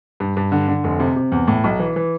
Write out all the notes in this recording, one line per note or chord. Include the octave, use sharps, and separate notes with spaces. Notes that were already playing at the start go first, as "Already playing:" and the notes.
G2
G2
D3
D3
F1
C3
C3
E2
A2
B1
E3
E3